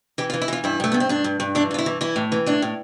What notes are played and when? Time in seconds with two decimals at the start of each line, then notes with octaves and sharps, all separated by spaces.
0.18 E3 G4
0.30 F4
0.33 E3
0.41 E4
0.48 E3 F4
0.64 G2 E4
0.80 G2 A3
0.92 G2 B3
1.00 C4
1.09 G2 D4
1.24 G2
1.40 G2
1.55 E3 D4
1.71 G2 F4
1.78 E4
1.86 E3
2.01 E3 E4
2.16 A2
2.32 E3
2.46 A2 D4
2.62 A2